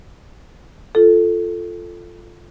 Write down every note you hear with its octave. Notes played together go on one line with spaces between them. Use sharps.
F4 A4